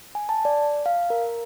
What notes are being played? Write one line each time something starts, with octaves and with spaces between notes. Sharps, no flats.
G#5
A5
D5
F5
A#4